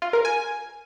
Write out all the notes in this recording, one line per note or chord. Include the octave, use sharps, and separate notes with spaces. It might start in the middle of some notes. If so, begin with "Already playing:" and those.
F4
A#4
G#5